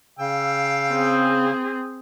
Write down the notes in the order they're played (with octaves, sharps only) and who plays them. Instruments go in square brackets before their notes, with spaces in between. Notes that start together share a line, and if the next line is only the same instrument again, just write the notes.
[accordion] C#3 [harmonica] F5 G5 E6
[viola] C4 G#4